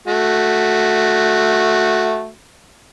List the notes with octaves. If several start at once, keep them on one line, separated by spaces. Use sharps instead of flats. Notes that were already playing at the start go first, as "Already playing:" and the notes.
A3 F#4